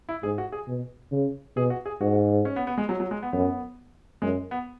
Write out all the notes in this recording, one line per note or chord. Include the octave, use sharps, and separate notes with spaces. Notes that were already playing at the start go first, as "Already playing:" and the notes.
E4
G#2 G#4
F#4
G#4
B2
C#3
B2 G#4
F#4
G#4
G#2 F#4
C#4
B3
B3
G#3
F#3
F#3
G#3
B3
F#2 B3
F#2 G#3
B3